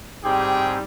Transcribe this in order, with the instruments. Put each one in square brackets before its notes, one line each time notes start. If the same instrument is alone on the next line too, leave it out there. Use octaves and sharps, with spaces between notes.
[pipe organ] G#2 C4 [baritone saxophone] G3 [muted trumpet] G4 [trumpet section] G#4 G5